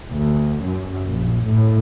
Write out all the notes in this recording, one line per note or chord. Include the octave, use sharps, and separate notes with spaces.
D2
F#2
A#1
A2